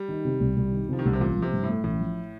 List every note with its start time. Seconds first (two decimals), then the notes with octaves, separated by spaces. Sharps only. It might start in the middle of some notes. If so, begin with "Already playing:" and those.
Already playing: G3
0.08 D#3
0.25 C3
0.40 C2
0.56 C2
0.72 D#3
0.89 C3 F3
0.99 D#3
1.05 C2 D3
1.13 C3
1.20 A1 A#2
1.36 F3
1.42 C3
1.53 G2
1.63 A2
1.68 A3
1.84 A1 A2
2.00 F3